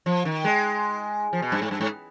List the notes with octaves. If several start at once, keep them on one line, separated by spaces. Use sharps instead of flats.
F3
D#3
G#3
F3
B2
G2
G#2
G2
G#2